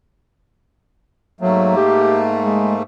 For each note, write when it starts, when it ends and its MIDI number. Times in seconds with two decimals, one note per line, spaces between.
1.41 2.83 44
1.41 1.74 54
1.41 2.83 57
1.41 2.83 58
1.77 2.21 67
2.41 2.75 56